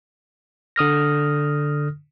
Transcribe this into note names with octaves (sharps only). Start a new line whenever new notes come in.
D3 D#6 F6 A#6